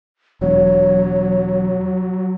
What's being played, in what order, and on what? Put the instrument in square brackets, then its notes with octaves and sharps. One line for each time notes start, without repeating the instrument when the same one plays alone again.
[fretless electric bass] E1 [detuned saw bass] F#3 [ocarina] C#5